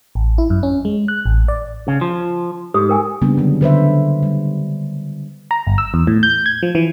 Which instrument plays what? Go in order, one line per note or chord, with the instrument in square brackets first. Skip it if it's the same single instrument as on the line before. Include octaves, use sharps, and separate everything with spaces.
[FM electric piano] A1
E4
F#2
C#4
G#3
F#6
A1
D5
[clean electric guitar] C#3
F3
[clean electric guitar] G#2 [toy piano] G4 A4 D#6
[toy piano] A#4 G5 G#5
[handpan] C#3 G3 A#3 B3 D4
D3 F#3
D3 B4 C5 E5
G3
[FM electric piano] A#5
G1
E6
E2
A2
G6
G#6
F3
E3